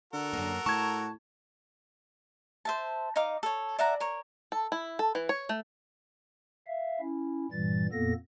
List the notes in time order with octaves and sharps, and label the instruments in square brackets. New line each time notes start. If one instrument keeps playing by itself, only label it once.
[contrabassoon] D3 [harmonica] F#4 A4 A#4
[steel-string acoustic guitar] F#2 A#3
[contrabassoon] A2 [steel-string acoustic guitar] A5 [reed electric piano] C#6 G#6
[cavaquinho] C5 E5 A5
D#4 D#5 F5 D6
A4 C#5
D5 E5 F#5 A#5
A#4 C#5
[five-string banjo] A4
E4
A4
E3
C#5
A3
[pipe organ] E5 F5
C#4 E4
G2 A#2 E3 G3 A6
F2 A#2 A#3 B3 A4 A#6